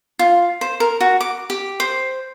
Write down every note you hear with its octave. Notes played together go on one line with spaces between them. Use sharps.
F4
C5
A#4
F#4
D6
G4
C5